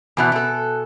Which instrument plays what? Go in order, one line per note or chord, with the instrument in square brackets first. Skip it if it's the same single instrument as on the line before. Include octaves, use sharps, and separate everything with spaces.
[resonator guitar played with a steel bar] E2 B2 E3 [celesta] G#5 A5 F#6
[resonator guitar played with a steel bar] B2 A4